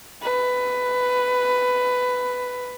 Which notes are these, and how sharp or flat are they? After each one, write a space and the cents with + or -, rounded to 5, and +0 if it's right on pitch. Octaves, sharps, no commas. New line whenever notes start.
B4 +15